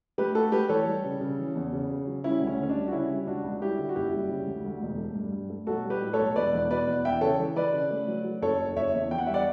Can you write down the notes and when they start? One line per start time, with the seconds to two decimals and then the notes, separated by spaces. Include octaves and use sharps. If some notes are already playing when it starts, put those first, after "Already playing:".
0.18 A3 G4 B4
0.35 A3 F#4 A4
0.52 A3 G4 B4
0.69 E3 A4 C#5
0.86 G3
1.04 C#3
1.21 C#3
1.39 E3
1.56 E2
1.73 C#3
1.90 C#3
2.07 F#3
2.24 G3 C#4 E4
2.41 D2
2.47 C#4
2.59 D3 C#4
2.69 D4
2.75 G3
2.88 F#4
2.92 C#3 C#4 E4
3.10 G3
3.27 C#2 D4 F#4
3.44 C#2
3.61 G3 E4 G4
3.78 D3
3.89 F#4
3.95 F#1 E4 G4
4.13 G3
4.29 C#3
4.47 D2
4.64 D2
4.82 E1
4.98 A3
5.15 G2
5.32 G2
5.50 A3
5.67 B1 F#4 A4
5.84 G3
5.90 G4 B4
6.01 A2
6.13 A4 C#5
6.19 B1
6.36 E1 B4 D5
6.53 E2
6.70 B2 B4 D5
6.87 E2
7.05 E3 E5 G5
7.21 C#3 A4 C#5
7.39 E3
7.56 E3 B4 D5
7.73 C#3
7.91 A3
8.08 F#3
8.24 F#3
8.41 F#1 A4 C#5
8.59 F#1
8.76 F#1 C#5 E5
8.94 E2
9.11 E2 G5
9.18 F#5
9.27 G3 E5
9.34 D5 F#5